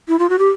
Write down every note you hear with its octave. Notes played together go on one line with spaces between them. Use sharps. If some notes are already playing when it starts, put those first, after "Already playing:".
E4
F4
F#4
G4